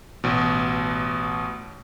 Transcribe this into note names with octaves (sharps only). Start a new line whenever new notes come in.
A1 B2